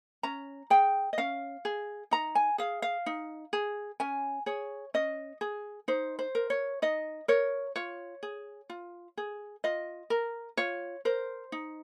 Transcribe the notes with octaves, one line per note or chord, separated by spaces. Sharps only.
C#4 A#5
G#4 G5
D#5
C#4 F5
G#4
D#4 A#5
G#5
G#4 F5
F5
D#4
G#4
C#4 G#5
G#4 C#5
C#4 D#5
G#4
D#4 C5
C5
A#4
C#5
D#4 D#5
A#4 C#5
F4 C#5
G#4
F4
G#4
F4 D#5
A#4
F4 C#5
A#4 C5
D#4